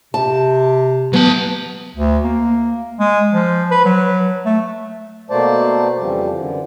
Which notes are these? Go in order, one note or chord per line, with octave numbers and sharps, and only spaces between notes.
C3 A5
F#3 B3 A5
D2
A#3
G#3
F3
B4
F#3
A3
B2 A3 A#3 C5 D5 A5
F2 C#3 E3 F3 G3
F#2 D3 E3